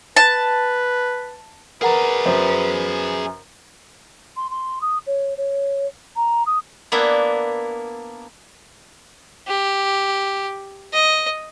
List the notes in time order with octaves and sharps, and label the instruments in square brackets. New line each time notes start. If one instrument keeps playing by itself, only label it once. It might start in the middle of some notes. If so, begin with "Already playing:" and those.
[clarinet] B4 [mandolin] A5
[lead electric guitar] G#4 D5 [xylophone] A#4 F#5 A#5 [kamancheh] B4
[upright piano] F#2 C5
[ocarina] C6
C6
D#6
C#5
C#5
A#5
D#6
[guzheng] A#3 B3 D4 E4
[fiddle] G4
D#5